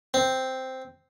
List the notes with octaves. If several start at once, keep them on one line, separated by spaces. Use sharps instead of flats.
C4